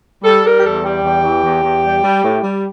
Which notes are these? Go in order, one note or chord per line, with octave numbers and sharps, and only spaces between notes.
G3 A4
G3 A#4
G4
E2 A4
G3 G4
E2
E3
E2
E2
G3
G3
A2
G3